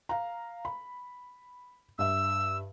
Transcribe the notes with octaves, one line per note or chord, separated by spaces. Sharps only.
F5 A#5
B5
G2 E5 E6